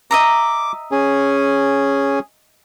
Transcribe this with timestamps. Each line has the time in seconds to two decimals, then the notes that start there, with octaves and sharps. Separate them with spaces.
0.11 D#5 E5 A#5 D6
0.92 C#4 G#4